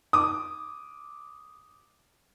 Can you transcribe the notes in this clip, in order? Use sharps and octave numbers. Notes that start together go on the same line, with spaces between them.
D6 D#6